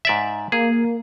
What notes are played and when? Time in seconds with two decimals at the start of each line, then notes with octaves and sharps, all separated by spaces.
0.05 G#2 D5 E5
0.52 A#3 G#4